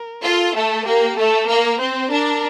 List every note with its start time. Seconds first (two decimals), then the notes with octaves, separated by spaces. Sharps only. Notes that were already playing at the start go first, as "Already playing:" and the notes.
Already playing: A#4
0.23 F4 A4
0.55 A3
0.86 A#3 G4
1.17 A3 A4
1.48 A#3 A#4
1.79 C4 C5
2.11 D4 A#4